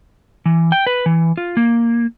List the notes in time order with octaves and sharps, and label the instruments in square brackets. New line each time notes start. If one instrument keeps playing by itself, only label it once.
[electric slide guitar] E3
G5
B4
E3
F4
A#3